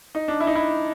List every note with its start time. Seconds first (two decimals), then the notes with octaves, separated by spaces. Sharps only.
0.15 D#4
0.28 D4
0.40 E4
0.47 D#4
0.55 E4